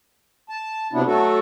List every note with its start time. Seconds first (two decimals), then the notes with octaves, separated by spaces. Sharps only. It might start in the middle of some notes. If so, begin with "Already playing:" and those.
0.49 A5
0.93 C3 F#3 B3 D4 E4
1.06 F#3 A3 F#4 A4